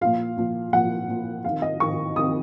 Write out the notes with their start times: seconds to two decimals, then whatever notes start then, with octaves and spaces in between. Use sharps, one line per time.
0.01 A#2 F3 F5
0.37 A#2 F3
0.73 A#2 F3 F#5
1.08 A#2 F3
1.44 C3 D#3 F5
1.62 D#5
1.80 C3 D#3 C#6
2.16 C3 D#3 D#6